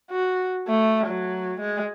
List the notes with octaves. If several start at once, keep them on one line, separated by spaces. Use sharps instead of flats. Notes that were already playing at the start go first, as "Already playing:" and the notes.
F#4
A3
F#3
G#3